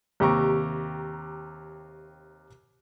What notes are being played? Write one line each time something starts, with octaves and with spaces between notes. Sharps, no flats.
D#2 C3 G4 A#5 C#6